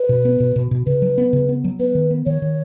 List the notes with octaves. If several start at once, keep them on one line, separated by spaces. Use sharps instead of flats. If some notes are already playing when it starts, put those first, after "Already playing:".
Already playing: B4
B2
B3
B2
B2
B2
C#3 B4
F#3
B3
C#3
B3
F#3
B3 B4
D#3
B3
D#3 C#5
D#3